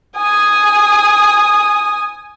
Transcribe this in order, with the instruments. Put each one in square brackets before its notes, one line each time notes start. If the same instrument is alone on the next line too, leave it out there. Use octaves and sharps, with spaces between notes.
[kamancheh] G#5 D#6